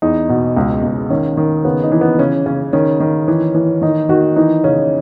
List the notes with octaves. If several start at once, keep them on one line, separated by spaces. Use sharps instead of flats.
E2 D#4
B2
C#2
C#2
D#3 C#4
D#3
C#3 B3
D#4
E3
B3
C#3 C#4
C#3 C#4
D#3 C#4
D#3
E3
E3
D#3 D#4
D#3 F#4
E3 D#4
C#3 C#4